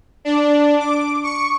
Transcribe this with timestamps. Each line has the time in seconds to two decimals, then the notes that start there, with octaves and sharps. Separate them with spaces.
0.25 D4
0.79 D6
1.24 C#6